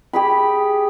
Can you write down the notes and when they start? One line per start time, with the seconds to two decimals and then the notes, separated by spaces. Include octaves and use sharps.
0.13 G4 G#4 B5